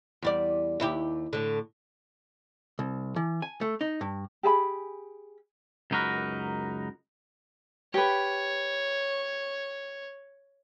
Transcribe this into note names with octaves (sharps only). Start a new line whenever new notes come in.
E2 G3 D5
D#2 E4 G4
A2 D3
C2
E3
G#5
A3
D#4
G2
G4 G#4 A5 B5
C#2 F#2 D#4 F#4 A#4 B4
G4 B4 C#5